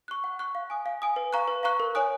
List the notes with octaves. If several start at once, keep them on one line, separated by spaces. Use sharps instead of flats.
C#6 F#6
F#5
C#6 F#6
F5
G#5 D#6
F5
G#5 D#6
B4
F5 A#5 C#6 F#6
B4
F5 A#5 C#6 F#6
A#4
C#5 G#5 D#6 F#6